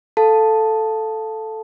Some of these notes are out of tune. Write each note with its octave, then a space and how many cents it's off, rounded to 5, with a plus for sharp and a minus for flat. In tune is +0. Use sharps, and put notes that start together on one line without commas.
A4 +0 F5 +0 A5 +0